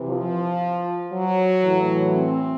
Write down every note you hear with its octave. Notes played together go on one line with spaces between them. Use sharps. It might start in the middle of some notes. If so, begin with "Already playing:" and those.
Already playing: C3 E3
F3
F#3
A2 E3
C4